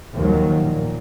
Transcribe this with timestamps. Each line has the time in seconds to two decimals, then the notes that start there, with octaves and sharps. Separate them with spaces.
0.15 D#2 D#3 F3 F#3
0.60 A#2